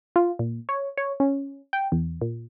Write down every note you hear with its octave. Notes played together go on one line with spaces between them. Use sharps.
F4
A#2
C#5
C#5
C#4
G5
E2
A#2